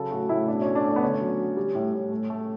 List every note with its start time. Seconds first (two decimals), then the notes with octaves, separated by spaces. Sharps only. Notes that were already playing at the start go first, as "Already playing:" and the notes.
Already playing: C#3 F#3 A4
0.11 A2 F#4
0.29 A2 E4
0.48 B2 D4
0.62 A3 C#4
0.75 D4
0.84 A3 C#4
0.96 B3
1.02 D3 C#4
1.21 F#3
1.39 F#3
1.57 G3
1.75 A2
1.92 A2
2.12 A3
2.30 A3